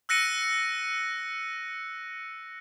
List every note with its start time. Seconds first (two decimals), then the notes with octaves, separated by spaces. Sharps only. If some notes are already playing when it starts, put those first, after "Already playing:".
0.09 E6 F#6 A#6 C#7 D#7